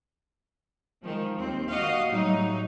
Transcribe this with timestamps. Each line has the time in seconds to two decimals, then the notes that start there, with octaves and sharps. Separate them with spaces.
1.03 D#3 F3 G#3
1.37 D#2 C4
1.69 A#3 F#4 D#5 F5
2.08 A2 F#3 G3 D#4